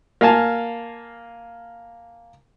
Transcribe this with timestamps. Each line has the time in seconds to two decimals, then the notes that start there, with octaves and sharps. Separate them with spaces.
0.21 A#3 F5 G#5 A5